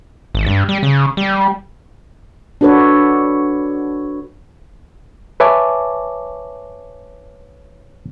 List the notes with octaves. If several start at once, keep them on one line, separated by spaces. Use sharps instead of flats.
G#1
G2
G3
C#3
G3
D4 F#4 A4 B4 C#5
B4 C#5 E5 G#5 A5 D6